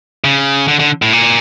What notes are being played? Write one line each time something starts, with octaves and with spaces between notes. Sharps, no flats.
C#3
D3
D3
A2
A#2